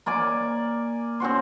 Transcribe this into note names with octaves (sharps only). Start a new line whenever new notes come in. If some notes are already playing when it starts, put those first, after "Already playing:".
A#3 D5 G#5 D6
C4 C#4 F#4 C5